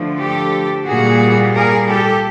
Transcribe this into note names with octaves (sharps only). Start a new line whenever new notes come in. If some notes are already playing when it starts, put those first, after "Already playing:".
Already playing: D3 F3 A3
G4 A4
A#2 G3 A#3 F#4 G#4
G#4 A#4
G4 A4